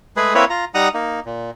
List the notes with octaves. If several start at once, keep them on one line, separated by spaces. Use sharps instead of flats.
G#3 A3 G#4 B4
A#3 C4 E4 B4 C#5
F4 A#5
G3 D#4 F#5 A#5 D#6
A#3 D#4
A#2